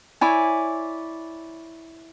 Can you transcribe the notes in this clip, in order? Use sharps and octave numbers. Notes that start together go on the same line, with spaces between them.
E4 C#5 D5 G#5